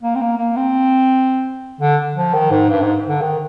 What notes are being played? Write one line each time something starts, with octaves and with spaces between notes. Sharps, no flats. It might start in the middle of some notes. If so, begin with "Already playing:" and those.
A#3
C4
A#3
A#3
C4
D3
F3
D#3
G#2
G2
G#2
D3
D#3